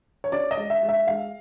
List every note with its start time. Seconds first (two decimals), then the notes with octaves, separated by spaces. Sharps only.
0.24 C#5
0.32 C#4 D5
0.51 D#5
0.57 G#3
0.70 E5
0.83 G#3
0.89 E5
1.07 G#3 F5